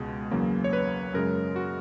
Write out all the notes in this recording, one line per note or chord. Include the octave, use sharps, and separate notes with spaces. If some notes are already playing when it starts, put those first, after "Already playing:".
Already playing: C#2 B2 G#3
E2 C#3 F#3 A#3
C#5
B4
F#2 C#3 G#3 A#4
F#4